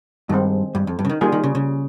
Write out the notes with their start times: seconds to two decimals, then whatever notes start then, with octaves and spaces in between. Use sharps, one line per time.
0.29 G2 D#3 G#3 C4
0.75 G2
0.87 F2
0.99 G2
1.05 C#3
1.10 D#3
1.21 D#3 G3 A#3 F4 G#4
1.32 D#3
1.44 C#3
1.55 C#3